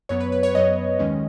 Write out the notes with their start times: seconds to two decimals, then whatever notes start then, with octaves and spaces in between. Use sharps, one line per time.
0.09 F#2 F#3 B3 C#5
0.20 B4
0.32 B4
0.43 C#5
0.54 F#2 F#3 B3 D#5
0.99 D#2 D#3 G#3 C#4